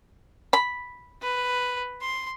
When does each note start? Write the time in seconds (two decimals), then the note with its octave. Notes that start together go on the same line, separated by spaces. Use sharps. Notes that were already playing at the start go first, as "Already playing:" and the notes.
0.53 B5
1.23 B4
2.01 C6